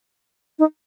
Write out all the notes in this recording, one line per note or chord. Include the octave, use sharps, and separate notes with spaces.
D#4